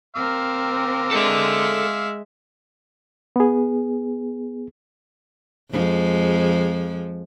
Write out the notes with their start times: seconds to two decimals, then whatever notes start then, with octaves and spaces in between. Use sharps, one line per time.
0.16 C4 A#4 F5 D6 E6
1.11 G#3 A4 D5 E5
3.36 B3 G#4
5.71 F2 F3 G#3